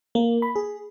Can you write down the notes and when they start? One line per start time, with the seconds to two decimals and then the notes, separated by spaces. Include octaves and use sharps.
0.15 A#3
0.42 B5
0.56 G#4